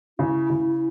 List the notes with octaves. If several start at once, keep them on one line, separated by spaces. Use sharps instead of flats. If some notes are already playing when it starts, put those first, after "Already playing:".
C#3 E4
C#3